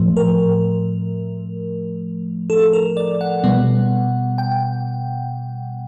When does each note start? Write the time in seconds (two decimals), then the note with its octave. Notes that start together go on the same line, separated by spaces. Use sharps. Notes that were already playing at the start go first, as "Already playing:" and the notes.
Already playing: A2 F3 A3
0.17 A#4
2.50 A4
2.73 A#4
2.97 D5
3.21 F#5
3.44 B2 G3 B3
4.38 G5